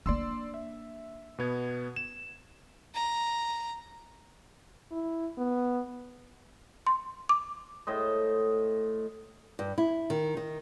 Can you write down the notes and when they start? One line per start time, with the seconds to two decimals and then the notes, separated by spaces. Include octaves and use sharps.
0.06 A#3 D4 D5 C6 E6
0.54 E5
1.38 B2 B3 G#6
1.96 E7
2.94 A#5
4.91 E4
5.38 B3
6.87 C6
7.29 D6
7.87 A2 C5 D#5
9.59 G2
9.78 E4
10.10 D#3
10.37 D#3